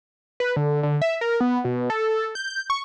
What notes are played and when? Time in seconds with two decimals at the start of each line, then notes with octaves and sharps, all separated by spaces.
0.40 B4
0.56 D3
0.83 D3
1.02 E5
1.21 A#4
1.40 B3
1.64 B2
1.90 A4
2.35 G6
2.70 C#6